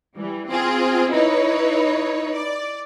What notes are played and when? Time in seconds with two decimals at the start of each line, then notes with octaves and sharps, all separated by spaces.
0.16 E3 G3
0.49 C4 F4 G#4
1.12 D#4 E4 B4 C#5
2.33 D5